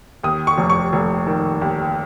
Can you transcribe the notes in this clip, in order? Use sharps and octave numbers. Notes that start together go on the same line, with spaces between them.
D#2 D#6
C#6
F1
C#6
F1
D#3
D#2